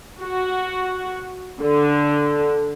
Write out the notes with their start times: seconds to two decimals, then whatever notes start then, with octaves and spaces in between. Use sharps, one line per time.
0.21 F#4
1.61 D3